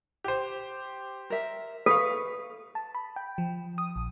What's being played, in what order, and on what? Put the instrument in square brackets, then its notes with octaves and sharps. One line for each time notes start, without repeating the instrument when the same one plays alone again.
[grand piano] G4 C5
[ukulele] A#4 E5
[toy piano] A4 [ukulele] B4 [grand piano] F5 C#6 B6
[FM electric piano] A5
B5
G5
F3
D#6
A#1